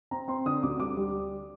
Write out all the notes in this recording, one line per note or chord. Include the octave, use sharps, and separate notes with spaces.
C4 A#5
C4 C6
D3 D#6
D2 D6
G3 D6
G3